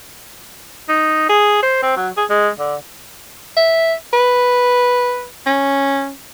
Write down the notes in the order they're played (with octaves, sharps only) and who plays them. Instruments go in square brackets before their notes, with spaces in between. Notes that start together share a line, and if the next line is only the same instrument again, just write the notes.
[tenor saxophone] D#4
G#4
C5
C4
F#3
G#4
G#3
D3
[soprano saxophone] E5
B4
C#4